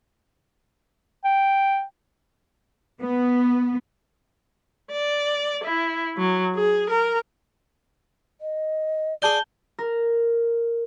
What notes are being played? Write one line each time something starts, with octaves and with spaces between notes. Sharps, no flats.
G5
B3
D5
E4
F#3
G#4
A#4
D#5
G#4 D5 A5 G6 G7
A#4